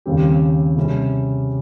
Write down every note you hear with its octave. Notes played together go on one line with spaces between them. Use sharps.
D#2 C#3 G3 C4 G4
C3 G3 C#4 G#4